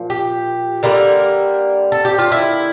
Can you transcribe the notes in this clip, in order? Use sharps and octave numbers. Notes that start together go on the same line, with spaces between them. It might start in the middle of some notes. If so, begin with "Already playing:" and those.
Already playing: A#2 F3
G4
D3 G3 A#3 A#4
A4
G4
F4
E4